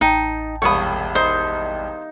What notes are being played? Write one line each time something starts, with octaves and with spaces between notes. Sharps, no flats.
A1 D#4 G5 A5
E1 C2 F5 B5 C#6 D#6
D#4 C5